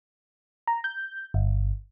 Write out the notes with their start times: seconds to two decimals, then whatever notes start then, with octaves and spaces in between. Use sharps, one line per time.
0.67 A#5
0.84 G6
1.34 G1